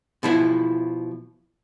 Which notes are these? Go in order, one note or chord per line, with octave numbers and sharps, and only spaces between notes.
B2 F3 E4